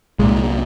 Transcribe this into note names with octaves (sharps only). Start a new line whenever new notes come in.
C2 A#2 G#3